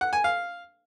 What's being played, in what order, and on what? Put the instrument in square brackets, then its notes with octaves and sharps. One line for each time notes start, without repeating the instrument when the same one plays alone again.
[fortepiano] F#5
G#5
F5